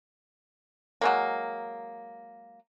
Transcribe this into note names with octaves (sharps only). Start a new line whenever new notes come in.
F#3 G#3 A#3